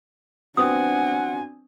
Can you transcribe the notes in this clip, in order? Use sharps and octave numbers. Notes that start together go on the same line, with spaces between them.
F#3 B3 C4 D4 F#5 G#5 D#6